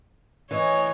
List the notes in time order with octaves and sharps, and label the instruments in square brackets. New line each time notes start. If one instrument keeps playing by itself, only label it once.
[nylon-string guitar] E3 [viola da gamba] C#5 [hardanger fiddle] D#5 G#5